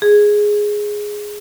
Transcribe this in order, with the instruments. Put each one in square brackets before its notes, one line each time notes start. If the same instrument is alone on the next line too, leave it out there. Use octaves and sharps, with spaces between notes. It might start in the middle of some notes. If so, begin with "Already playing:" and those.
[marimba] G#4